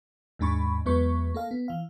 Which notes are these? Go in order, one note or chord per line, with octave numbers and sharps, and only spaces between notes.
D#2 G#2 G#3 D4 B5 C#6
E2 F#3 G#3 B3 B4 C#6
A#3 A4 F5
B3
E3 F5